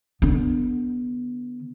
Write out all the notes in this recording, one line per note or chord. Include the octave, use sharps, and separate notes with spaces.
D3 B3